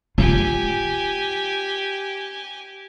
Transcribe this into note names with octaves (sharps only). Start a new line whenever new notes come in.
F4 G4 G#5